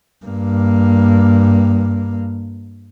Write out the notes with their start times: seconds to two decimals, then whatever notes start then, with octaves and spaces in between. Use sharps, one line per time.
0.25 G2 A#3